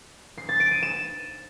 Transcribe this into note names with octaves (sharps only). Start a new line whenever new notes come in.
C7
A6
D7
D#7
E7